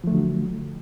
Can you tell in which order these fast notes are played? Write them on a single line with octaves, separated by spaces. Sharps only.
F3 A3 D3 F#3